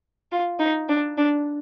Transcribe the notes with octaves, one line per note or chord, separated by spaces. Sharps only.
F4
D#4
D4
D4